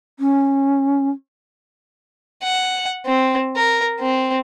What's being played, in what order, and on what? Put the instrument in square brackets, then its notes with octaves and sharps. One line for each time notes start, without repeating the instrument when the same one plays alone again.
[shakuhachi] C#4
[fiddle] F#5
C4
A#4
C4